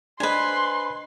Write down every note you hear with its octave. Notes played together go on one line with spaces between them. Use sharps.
D4 B4 C5 D#5 G#5 C6